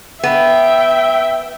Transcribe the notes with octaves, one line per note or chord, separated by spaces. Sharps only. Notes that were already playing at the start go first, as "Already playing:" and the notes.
B3 E5 G5